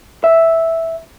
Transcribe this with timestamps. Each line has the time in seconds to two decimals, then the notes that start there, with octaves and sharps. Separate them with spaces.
0.24 E5